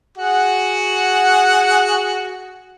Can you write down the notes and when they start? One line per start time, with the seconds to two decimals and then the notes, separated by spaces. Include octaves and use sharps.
0.17 F#4 G#4 F#5